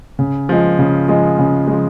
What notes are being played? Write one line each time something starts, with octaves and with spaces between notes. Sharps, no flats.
C#3
F3 G#3
C#3
F3 G#3
C#3
F3 G#3